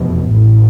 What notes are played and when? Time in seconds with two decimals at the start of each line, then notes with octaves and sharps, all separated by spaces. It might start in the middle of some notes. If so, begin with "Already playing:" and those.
Already playing: F1 E2 B2
0.31 A1 A2